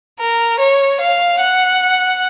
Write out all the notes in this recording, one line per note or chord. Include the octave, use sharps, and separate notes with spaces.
A#4
C#5
F5
F#5